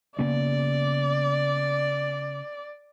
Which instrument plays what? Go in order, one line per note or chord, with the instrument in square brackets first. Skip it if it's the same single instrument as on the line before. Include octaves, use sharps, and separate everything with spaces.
[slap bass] C#3 A#3 B3 [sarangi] D5